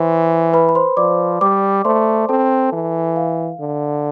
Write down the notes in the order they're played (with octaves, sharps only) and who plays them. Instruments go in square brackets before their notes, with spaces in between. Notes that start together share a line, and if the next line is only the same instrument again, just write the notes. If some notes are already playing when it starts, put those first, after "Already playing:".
Already playing: [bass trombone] E3 [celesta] C5 C6
[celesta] B4 B5
B5
C5 C6
[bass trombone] F3 [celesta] D5 D6
[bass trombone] G3 [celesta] D5 D6
[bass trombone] A3 [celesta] C5 C6
[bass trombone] C4 [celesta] A4 A5
[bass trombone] E3
[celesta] F5
[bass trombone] D3